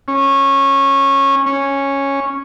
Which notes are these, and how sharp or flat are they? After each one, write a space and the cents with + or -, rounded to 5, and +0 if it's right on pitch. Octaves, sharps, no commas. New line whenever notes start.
C#4 -15
C#4 -5